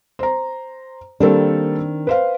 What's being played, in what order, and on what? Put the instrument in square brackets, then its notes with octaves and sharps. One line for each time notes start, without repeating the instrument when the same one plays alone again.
[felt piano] C5 A#5
[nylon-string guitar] D#3 C4 D4 [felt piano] G3 A#3 A4
[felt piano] B4 C5 F5